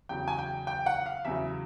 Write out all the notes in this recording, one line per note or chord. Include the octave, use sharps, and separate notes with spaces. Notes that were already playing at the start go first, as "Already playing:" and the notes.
E2 C#3 F#3 G5
G#5
G5
G5
F#5
F5
E2 C#3 F#3 E5